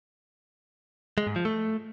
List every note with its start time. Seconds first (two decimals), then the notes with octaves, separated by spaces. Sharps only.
1.18 G#3
1.27 G#2
1.36 F3
1.45 A3